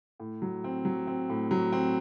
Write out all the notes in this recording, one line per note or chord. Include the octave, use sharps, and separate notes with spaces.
A2
F#3
C4
F#3
C4
A2
F#3
C4